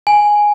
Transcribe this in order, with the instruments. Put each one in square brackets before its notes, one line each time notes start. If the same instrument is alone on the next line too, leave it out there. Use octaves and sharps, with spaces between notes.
[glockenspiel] G#5